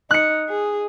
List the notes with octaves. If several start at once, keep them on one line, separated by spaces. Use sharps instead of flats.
D#4 F#6 C#7
G#4